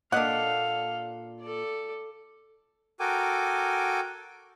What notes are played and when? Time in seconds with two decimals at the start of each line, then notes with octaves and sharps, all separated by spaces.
0.12 A#2 D4 A4 D#5 F5 F#5
1.41 A4 D5
3.00 F#4 A4 A#4 G5 G#5 D6